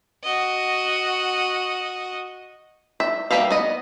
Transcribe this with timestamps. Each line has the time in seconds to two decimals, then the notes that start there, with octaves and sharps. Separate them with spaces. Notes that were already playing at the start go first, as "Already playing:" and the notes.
0.24 F#4 D#5
3.00 E5
3.31 G3 A#3 B4 E5 F5
3.50 B3 D#5